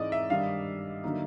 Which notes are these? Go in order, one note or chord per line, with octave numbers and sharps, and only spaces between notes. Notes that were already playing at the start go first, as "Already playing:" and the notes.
Already playing: G#2 E3 G#3 C4 D#4 D5 D#5
E5
G2 D#3 G3 F5
D3 F#3 A#3 D#4